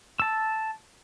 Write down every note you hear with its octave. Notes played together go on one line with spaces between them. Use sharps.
A5 E6